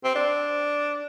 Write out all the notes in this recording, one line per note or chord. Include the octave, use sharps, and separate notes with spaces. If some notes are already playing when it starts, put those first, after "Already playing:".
C4
D4